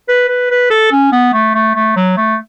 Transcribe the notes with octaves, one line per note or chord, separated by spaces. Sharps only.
B4
B4
B4
A4
C#4
B3
A3
A3
A3
F#3
A3